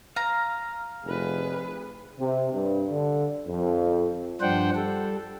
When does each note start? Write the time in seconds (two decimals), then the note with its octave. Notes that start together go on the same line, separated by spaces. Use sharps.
0.16 F5 A#5
1.04 F1 G#4 B4
2.19 C3
2.52 G2
2.90 D3
3.48 F2
4.41 G2 F3 D4 C5 F#5 G5
4.76 G3 A4